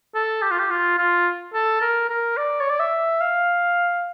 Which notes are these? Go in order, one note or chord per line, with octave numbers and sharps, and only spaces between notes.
A4
G4
F4
G4
F4
F4
A4
A#4
A#4
D5
C#5
D5
E5
F5